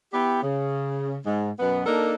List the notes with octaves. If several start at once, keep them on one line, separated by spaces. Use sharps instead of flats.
B3 E4 G4
C#3
G#2
F#2 B2 B3
A#3 D4 D#4 A4 A#4